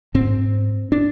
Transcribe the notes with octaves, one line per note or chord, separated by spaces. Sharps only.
G#2 C4
D4